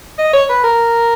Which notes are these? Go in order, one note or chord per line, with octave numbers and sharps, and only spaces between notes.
D#5
C#5
B4
A#4